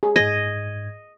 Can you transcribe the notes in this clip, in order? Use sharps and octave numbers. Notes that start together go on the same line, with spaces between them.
G#4
G#2 D#5 G#6